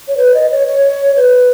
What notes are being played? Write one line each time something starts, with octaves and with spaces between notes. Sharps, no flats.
C#5
B4
D#5
C#5
C#5
B4